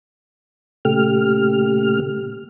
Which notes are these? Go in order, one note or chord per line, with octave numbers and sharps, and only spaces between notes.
A#2 C#3 A3 G4 F6